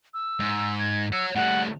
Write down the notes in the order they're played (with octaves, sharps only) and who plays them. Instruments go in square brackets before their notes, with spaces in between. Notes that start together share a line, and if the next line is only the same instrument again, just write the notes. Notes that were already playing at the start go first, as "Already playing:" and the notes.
[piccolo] E6
[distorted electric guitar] G#2
[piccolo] G#6
[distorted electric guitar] C#5 F#5 [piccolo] E6
[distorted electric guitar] A2 G3 [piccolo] F#5